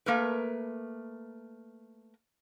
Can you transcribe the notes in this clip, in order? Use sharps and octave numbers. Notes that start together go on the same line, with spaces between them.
A3 A#3 A#4 B4